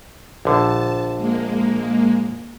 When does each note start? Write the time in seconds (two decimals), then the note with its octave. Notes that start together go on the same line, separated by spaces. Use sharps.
0.45 A#1 D3 A5
1.17 G#3 A#3